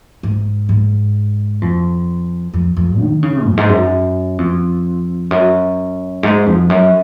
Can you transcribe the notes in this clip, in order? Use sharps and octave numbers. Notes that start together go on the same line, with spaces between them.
G#2
G#2
F2
F2
F2
D#3
C#3
F#2
G#2
F#2
F2
F#2
G#2
F2
F#2